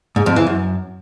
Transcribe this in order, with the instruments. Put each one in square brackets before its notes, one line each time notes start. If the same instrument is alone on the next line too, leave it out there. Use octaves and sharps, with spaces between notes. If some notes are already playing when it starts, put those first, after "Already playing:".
[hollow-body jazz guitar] G#2
F2
E3
F#2